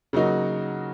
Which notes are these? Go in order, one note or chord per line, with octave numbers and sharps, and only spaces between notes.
C#3 F#3 A#3 D#4 F#4